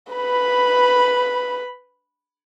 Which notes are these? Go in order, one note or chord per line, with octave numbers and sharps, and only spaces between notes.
B4 B5